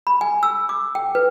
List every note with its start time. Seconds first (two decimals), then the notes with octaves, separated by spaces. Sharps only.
0.07 B5
0.21 G#5
0.43 E6
0.69 D6
0.95 G5
1.15 B4